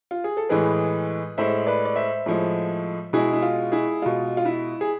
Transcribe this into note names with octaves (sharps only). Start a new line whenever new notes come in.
F4
G#4
A4
A2 E3 G#3 G#4 B4
A2 G#3 C5 E5
B4 D5
D5
C5 E5
A2 F3 G#3
B2 G#3 E4 G#4
E4
F4
E4 G#4
B2 G#3 F4
F4
E4
G#4